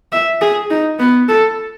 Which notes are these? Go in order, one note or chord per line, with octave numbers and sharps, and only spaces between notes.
E5
G#4
D#4
B3
A4